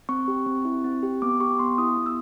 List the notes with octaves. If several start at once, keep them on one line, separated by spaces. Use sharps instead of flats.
C4 C#6
G4
C4
E4
C4
G4
B3 D6
G4 C#6
B3 C6
E4 D#6
B3
E6